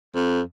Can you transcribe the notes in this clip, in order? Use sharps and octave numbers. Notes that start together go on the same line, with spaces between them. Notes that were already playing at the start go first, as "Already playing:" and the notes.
F2